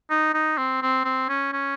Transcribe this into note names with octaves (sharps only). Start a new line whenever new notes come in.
D#4
D#4
C4
C4
C4
C#4
C#4